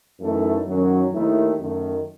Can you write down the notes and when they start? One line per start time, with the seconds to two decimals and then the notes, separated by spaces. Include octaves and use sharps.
0.20 F#2 E3 A3 D#4 A4
0.66 F#2 D#3 F#3 C#4
1.12 D#2 D#3 A3 E4
1.59 F#2 D#3 A3